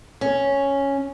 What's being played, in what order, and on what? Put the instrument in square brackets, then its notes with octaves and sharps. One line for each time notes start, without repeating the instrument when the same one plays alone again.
[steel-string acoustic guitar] C#4